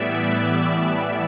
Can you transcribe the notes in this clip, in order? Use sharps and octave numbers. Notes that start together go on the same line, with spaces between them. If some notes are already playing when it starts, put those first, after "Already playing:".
Already playing: A2 E3 G3 B3 D5 E5
D5